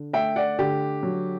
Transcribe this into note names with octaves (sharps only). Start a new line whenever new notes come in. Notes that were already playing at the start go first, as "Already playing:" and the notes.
Already playing: D3
A3 E5 G5
D5 F#5
D3 G4
F#3